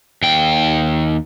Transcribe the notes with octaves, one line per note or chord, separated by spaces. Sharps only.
D#2 G5